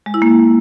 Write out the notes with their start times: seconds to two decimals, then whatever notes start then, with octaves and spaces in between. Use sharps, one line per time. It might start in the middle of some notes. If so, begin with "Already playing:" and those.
0.06 G#3
0.14 E4
0.22 A#3